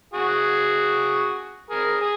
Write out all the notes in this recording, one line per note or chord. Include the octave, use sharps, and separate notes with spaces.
F#4 G#4
G#4 A#4
G#4